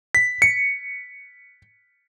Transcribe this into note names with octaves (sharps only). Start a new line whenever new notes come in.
B6
C#7